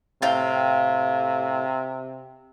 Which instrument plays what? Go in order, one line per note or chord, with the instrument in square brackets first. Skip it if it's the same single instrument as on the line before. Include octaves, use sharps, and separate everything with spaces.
[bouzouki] A2 F5 G5 [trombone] C3